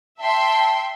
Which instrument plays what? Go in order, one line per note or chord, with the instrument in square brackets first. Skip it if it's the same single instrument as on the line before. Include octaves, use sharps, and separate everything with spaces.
[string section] E5 G5 C6 [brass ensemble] A5